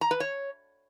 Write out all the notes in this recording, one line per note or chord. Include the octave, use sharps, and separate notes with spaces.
A#5
B4
C#5